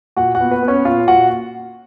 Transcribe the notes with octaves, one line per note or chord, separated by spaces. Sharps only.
A#2 F#4 F#5
F#4 F#5
B3
B4
B3
C#4 C#5
A#2 F4 F5
A#2 F#4 F#5